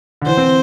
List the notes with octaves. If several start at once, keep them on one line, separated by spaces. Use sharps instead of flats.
D3
E3 C5
C4